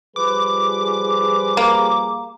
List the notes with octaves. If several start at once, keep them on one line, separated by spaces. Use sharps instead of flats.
F3 G3 G#4 B4 D6
A#3